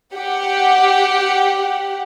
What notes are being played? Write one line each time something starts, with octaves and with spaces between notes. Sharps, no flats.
G4 F#5